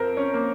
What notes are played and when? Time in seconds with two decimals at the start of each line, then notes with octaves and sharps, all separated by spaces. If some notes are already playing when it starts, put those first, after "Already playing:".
Already playing: F2 A#4 C5
0.17 C#4
0.34 A#3